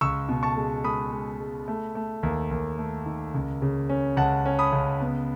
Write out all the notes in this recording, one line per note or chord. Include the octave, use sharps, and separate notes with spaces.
C#2 C#6 E6
B2
A5 C#6
G#3
G#3 B5 D#6
G#3
G#3
A3
A3
D#2
D#2
A3
D#3
C#2
C#3
C#4
C#2 F#5 A5
C#4
B5 D#6
C#2
B3